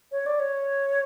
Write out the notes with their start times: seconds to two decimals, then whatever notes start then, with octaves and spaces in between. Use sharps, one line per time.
0.12 C#5
0.26 D5
0.40 C#5